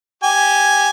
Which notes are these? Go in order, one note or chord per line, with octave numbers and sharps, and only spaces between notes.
G4 G#5